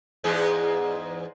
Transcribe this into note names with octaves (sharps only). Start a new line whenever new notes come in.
E2 G#2 G#4